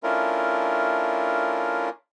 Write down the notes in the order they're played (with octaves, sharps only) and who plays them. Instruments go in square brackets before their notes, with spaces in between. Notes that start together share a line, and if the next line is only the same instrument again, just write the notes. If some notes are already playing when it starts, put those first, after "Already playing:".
[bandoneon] A3 C#4 D4 E4 F4 A#4